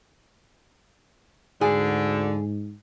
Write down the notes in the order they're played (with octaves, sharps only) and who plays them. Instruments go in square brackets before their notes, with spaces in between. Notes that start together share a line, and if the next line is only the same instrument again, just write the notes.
[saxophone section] D2 D3 [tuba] G#2 [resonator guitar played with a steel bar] G#4